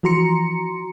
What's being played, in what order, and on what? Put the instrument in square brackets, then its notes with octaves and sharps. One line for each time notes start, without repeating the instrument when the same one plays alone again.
[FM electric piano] E3 F3 F#4 A#5 C6 C#7